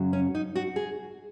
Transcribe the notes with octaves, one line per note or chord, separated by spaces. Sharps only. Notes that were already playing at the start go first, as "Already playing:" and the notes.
Already playing: F#2 C#3 F#3
C#4
D#4
F#4
G#4